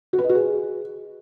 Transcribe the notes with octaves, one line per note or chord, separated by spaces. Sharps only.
F#4
B4
D#5
F#4
G#4